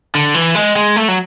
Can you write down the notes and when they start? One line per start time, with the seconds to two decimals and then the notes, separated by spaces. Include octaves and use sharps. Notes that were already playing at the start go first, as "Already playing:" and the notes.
0.15 D3
0.34 E3
0.55 G#3
0.76 G#3
0.96 A3
1.08 F#3